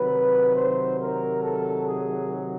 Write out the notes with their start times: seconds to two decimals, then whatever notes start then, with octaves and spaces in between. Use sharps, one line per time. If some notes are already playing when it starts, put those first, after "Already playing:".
Already playing: C3 D#3 F#3 B4
0.56 C5
0.99 A#4
1.43 A4
1.87 G#4